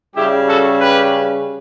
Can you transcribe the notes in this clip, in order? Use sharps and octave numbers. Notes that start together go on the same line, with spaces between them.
C#3 G3 C#4 E4 G4
F#4 A4
G4 B4